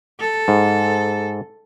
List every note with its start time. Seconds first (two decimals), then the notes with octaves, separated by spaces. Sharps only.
0.20 A4
0.48 G#2